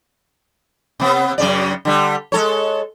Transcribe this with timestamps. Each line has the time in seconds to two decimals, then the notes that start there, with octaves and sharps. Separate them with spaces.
1.00 C3 B3
1.38 F#2 C#3 D5
1.85 D3 G3
2.32 G#3 A4 C#5